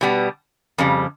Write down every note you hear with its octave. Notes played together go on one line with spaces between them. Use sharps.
B2 G3 B3
F2 C#3 G3